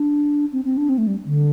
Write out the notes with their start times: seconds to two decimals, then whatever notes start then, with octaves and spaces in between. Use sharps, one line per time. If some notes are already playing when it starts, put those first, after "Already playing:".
Already playing: D4
0.53 C4
0.65 C4
0.77 D4
0.89 C4
0.98 A3
1.07 G3
1.25 D3